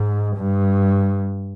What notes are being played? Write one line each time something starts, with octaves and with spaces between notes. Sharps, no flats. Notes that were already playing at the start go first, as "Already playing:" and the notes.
Already playing: G#2
G2